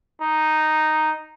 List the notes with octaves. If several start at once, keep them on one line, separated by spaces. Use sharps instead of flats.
D#4